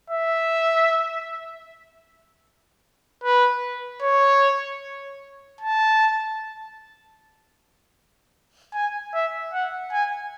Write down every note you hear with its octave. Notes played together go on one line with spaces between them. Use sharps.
E5
B4
C#5
A5
G#5
E5
F#5
G#5